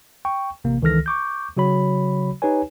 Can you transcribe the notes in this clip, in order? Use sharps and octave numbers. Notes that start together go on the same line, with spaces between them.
G5 C#6
A1 C3 A#3
C#2 D#3 E3 A4 F6 A#6
C#6 D6 G6
C#3 F#3 F#4 C#5 B5
D#4 G4 B4 C#5 G#5